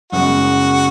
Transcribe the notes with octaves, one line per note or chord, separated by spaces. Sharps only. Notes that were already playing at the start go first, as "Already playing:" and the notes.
F#1 F#2 C#3 G#3 B3 F#4